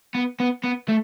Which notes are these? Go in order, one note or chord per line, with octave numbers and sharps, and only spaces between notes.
B3
B3
B3
A3